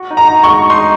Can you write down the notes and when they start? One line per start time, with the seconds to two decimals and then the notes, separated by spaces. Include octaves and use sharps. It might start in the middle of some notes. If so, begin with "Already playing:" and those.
Already playing: F#4
0.11 D#4
0.17 A#5
0.30 F#4
0.44 C#6
0.51 G#3
0.70 D#4 C6